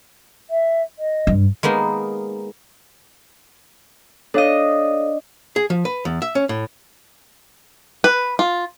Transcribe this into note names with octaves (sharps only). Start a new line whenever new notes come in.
E5
D#5
G2
G#3 A#3 B3 D#4
D4 A4 C#5 D#5 F5
G#4
F3
B4
E2
E5
C#4
A2
B4
F4